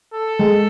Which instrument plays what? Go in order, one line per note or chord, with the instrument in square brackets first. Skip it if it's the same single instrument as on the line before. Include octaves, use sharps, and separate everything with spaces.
[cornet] A4
[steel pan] G#3